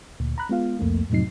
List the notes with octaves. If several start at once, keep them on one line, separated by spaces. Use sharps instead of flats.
D2 A#2
A#5 B5 F#6
G#3 B3 F4 F5
C2 F2 A3 A#3
F2 A2 C3 F#3 D#4 C7